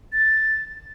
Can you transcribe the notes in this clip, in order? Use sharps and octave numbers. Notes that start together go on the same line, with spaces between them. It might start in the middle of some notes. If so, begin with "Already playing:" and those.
A6